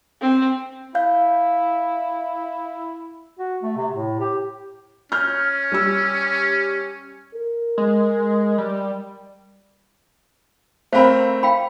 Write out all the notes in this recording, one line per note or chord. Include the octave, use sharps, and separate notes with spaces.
C4
E4 F5 G6
F#4
A3
C3
A2
G4
C#4 F6 G6
G3 G4 E6
A#4
G#3
G3
A3 C4 A#4 C5 F5 B5
F5 G5 B5